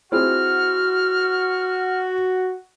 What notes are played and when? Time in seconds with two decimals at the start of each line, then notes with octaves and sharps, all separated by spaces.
0.12 C4 E4 F#4 G#4 F6